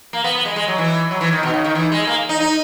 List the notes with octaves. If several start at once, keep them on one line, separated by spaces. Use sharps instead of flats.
A#3
B3
B3
G#3
G#3
F#3
E3
F#3
E3
D#3
B2
C#3
D#3
E3
G#3
A#3
D#4
D#4